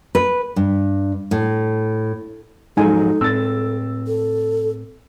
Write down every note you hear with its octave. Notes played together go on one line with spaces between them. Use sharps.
B4
G2
A2
G#2 F3 F#3 G#3 D#4 A4 G#5
A2 C4 E6 A6
A4